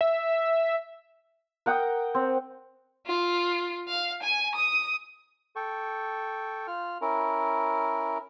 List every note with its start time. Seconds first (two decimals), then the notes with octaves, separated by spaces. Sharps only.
0.01 E5
1.66 A#4 F#5 G5 D#6
2.15 C4
3.07 F4
3.88 F5
4.22 G#5
4.55 D#6
5.56 A4 G5 C#6
6.67 F4 F6
7.01 C#4 E4 A#4